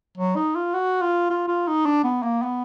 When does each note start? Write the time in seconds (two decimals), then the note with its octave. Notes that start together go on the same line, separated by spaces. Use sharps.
0.17 F#3
0.36 D#4
0.55 F4
0.74 F#4
1.01 F4
1.30 F4
1.48 F4
1.67 D#4
1.85 D4
2.04 B3
2.23 A#3
2.42 B3